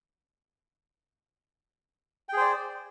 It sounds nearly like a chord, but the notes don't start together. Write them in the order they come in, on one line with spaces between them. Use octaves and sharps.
G5 G#4 C5 D5